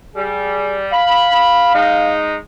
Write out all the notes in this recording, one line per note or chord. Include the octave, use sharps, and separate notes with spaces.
G3 G#4
F5 B5
G#3 D#4